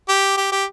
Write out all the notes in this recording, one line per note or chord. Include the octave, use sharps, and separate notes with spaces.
G4
G4
G4